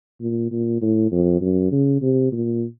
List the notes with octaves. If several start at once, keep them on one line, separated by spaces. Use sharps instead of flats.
A#2
A#2
A2
F2
F#2
C#3
C3
A#2